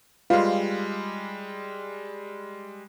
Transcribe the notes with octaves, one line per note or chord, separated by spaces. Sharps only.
G3 G#3 F4 B4 F5